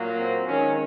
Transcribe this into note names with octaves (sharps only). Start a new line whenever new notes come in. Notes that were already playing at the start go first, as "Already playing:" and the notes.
Already playing: A#2 F#3 A#3
C4
D#3 G#3 C#4